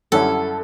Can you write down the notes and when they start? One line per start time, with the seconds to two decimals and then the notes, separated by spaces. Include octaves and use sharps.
0.12 F#2 D3 G3 C#4 E4 A4